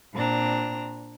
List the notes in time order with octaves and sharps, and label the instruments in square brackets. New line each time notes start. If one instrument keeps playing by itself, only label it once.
[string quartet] A#2 C4 D4 A#5